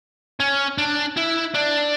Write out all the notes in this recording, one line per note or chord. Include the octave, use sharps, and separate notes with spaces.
C#4
D4
E4
D4